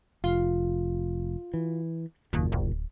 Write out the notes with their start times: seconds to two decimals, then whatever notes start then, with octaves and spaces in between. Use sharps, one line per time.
0.24 F1 F4
1.54 E3
2.33 F#1 D#2 A#2
2.52 D1